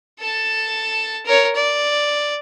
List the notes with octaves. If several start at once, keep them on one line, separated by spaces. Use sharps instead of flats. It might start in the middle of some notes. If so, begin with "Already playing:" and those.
A4 A5
A#4 C#5
D5